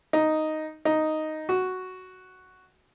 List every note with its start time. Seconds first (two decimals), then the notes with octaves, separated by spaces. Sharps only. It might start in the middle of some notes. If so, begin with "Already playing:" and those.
0.13 D#4
0.85 D#4
1.49 F#4